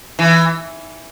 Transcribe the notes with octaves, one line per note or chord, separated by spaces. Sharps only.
E3